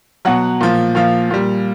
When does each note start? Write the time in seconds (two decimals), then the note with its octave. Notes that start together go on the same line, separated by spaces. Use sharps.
0.25 B2 F#3 F#5
0.61 A#2 F3
0.95 A#2 F3 F5
1.30 A#2 G3